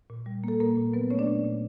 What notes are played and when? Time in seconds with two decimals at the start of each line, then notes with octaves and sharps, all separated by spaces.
0.10 A#2
0.26 G3
0.44 A#3 A4
0.60 A#2 A#3 A#4
0.77 A#2
0.94 F#3 B3 B4
1.10 A3 C#4 C#5
1.19 D4 D5
1.27 A#2
1.44 A#2